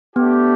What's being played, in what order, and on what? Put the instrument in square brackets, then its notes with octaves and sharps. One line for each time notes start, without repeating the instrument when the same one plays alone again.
[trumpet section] A3 D4 G4 [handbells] B3